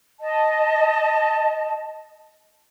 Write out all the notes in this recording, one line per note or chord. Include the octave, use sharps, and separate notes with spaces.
D#5 A5